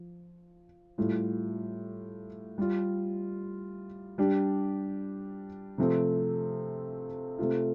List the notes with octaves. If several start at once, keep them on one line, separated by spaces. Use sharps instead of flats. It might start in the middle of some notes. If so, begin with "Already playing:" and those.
Already playing: F3
A2 G3 F4
G3 F4
G3 D4 G4
C3 F3 A3 C4
C3 A3 F4